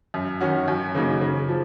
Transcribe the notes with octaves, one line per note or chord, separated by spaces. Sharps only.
F#2
D#3 F#3 C#4 F#4
F#2
C#3 F#3 A#3 D#4
C#3
F3